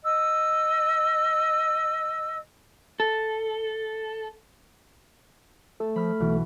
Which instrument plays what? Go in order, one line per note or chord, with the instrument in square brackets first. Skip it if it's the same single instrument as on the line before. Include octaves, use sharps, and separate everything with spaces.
[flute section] D#5 E6
[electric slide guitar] A4
[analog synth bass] A3 [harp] A4
[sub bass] F3 [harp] B5 F6
[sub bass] B1 [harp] B2 E3